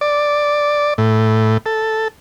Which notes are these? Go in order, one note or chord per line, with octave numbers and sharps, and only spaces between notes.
D5
A2
A4